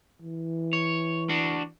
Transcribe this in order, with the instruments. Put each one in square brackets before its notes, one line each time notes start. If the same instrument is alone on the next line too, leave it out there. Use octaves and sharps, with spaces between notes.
[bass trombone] E3
[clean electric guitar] C#5
D4 F#4